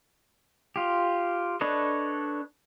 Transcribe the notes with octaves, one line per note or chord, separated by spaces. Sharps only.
F4 G4
D4 A4 B4 C#5 D#5